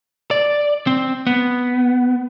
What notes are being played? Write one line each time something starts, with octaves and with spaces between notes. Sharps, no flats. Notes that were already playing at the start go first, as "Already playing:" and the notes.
D5
C4
B3